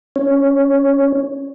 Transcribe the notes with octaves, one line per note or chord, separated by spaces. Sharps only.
C#4 C#5